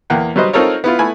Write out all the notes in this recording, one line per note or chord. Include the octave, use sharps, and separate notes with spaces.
E2 A#3 F#5 G5
F#3 G3 B4 C5 D#5
C4 D#4 F4 A4 A#4 C#5
B3 E4 F4
A3 B3 E4 G#5 B5